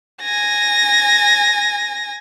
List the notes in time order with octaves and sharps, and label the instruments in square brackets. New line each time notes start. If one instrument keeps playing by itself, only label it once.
[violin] G#5 A#6